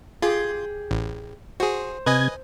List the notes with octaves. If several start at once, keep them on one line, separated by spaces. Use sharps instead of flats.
F4 G4 G#4 C6
A1
F#4 G#4 C5
C3 B4 D#5 G#5 G#6